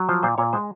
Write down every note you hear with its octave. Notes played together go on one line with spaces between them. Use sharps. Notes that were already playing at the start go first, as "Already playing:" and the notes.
Already playing: F#3
F3 C5
A#2 C5
A#2 C#5
G#3 C5